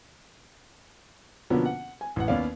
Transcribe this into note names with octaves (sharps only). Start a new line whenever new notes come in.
B2 D3 F3 A#3 B3 C#4
F#5
G#5
A1 F#5
D#2 B3 C#4 D5 F5